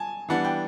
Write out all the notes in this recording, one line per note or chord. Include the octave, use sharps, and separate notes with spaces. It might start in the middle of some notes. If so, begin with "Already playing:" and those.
Already playing: G#5 A5
E3 G3 B3 D4 F#5
G5